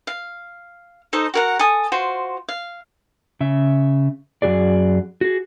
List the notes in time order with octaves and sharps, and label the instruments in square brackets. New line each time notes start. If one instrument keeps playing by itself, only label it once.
[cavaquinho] F5
D#4 A4 C5 D#5
F#4 A#4 F#5
A4 G#5 D#6
F4 F#4 C5
F5
[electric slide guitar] C#3 E5
F#2 F#3 F#4 G#4 D5
F#4 G#4